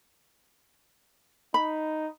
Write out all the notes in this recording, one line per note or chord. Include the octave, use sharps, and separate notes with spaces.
D#4 B5